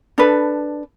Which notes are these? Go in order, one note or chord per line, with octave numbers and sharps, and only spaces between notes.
D4 A4 B4